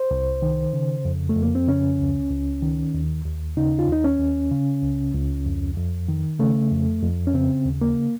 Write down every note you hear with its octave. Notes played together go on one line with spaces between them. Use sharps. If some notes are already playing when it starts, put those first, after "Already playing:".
Already playing: C5
C2
D#3
C#3
F2
A3
F2
A#3
C4
C#3 C#4
C#2
C#2
D#3
D#2
D#2
C#3 D#4
F4
D#2 D#4
C#4
D#2
C#3
C#2
C#2
F2
F2
D#3
C#3 A3
F2
F2
C#4
C#3 C4
D#2
A#3